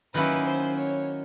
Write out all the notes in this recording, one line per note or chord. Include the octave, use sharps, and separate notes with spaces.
D#3 F#3 A#3 C#4 E4 B4
C5
C#5